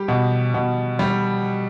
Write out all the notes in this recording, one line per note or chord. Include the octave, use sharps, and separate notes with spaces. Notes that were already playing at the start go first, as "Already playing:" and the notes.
Already playing: G3 G4
B2
B2
G3